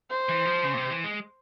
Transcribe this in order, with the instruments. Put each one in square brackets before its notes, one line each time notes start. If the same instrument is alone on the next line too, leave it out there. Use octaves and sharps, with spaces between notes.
[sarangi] C5
[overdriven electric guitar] E3
F3
C#3
A#2
C3
E3
G#3